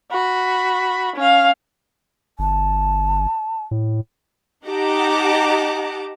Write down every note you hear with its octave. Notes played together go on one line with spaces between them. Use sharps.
F#4 B5
C#4 F5
G1 A5
A2
D#4 G4 F#5 A5 A#5 D6